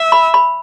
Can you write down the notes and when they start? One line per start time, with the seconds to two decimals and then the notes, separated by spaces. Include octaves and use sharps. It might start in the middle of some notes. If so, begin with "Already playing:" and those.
Already playing: E5
0.12 B5
0.34 B5